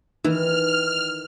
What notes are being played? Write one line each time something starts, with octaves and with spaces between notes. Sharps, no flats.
D#3 E3 F6